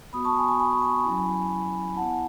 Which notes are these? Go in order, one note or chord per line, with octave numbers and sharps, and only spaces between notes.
B3 F#4 B5 D#6
A5 C#6
G#5 B5
G#5 B5
G#5 B5
C#6
G#5 B5
F#3 C#4 E4
B3 E4 F#5 A5